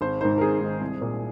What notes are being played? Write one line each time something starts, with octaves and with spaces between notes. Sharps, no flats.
G#1 C5
G#2 D#3 C5
A#4
G#1 G#4
G#2 D#3
C2
A#2